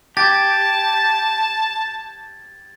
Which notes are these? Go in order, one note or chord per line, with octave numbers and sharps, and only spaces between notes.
G4 A5 G#6 A6